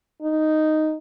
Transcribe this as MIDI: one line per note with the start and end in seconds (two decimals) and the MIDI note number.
0.22 0.97 63